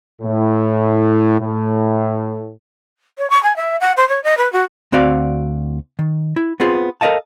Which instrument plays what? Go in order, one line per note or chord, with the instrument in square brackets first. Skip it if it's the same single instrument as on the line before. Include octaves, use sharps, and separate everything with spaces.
[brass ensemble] A2
A2
[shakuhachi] C#5
C#6
G#5
E5
F#5
C5
C#5
D#5
B4
F#4
[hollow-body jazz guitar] D2 C4 F#4 D5 F5
D#3
E4
B3 C4 F4 G#4 C5
A4 A#4 D5 D#5 F5 A5